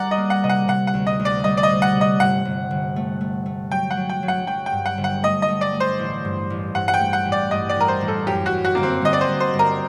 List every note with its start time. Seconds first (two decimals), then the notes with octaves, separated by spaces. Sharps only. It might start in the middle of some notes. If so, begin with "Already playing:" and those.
Already playing: G3 A#4 D5 F#5
0.11 D#5
0.17 A#3
0.30 F#5
0.44 C3 D#5
0.49 F#5
0.68 C3 F#5
0.87 F#5
0.94 D2
1.07 D#5
1.19 D2
1.25 D5
1.44 G3 D#5
1.57 D5
1.63 D#5
1.70 C3
1.82 F#5
1.95 C3
2.01 D#5
2.20 G1 F#5
2.45 G1
2.71 G1
2.96 A3
3.21 A3
3.46 A3
3.71 F#3 G5
3.91 F#5
3.97 F#3
4.09 G5
4.23 F#3
4.28 F#5
4.47 F#3 G5
4.66 G5
4.72 G2
4.86 F#5
4.98 G1
5.04 F#5
5.23 A3 D#5
5.42 D#5
5.48 A3
5.61 D5
5.74 A3
5.80 C5
5.99 A1
6.25 G2
6.50 A1
6.75 G2 F#5
6.88 F#5
6.94 G5
7.00 A3
7.13 F#5
7.25 A1
7.32 D5
7.51 G2 D#5
7.69 D5
7.76 A1 A#4
7.88 C5
8.01 A1
8.08 A4
8.27 F#2 G4
8.46 F#4
8.52 F#2
8.65 F#4
8.75 G1 A#3
8.83 C4
9.02 G1 D#5
9.13 D5
9.21 C5
9.28 G1
9.40 C5
9.53 G1
9.59 A#4